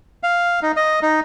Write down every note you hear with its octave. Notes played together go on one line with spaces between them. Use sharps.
F5
D#4
D#5
D#4